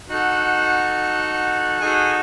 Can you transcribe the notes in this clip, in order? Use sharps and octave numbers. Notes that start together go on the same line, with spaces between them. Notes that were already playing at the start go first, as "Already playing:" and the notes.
D#4 F#4 A4 F#5
D#4 F#4 G#4 A4 G#5